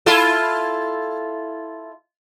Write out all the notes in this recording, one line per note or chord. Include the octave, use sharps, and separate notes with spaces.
E4 F4 A4